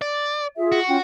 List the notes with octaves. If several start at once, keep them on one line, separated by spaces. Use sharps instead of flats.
D5
F4 G#4 E5
F#4
C#4 F4 G5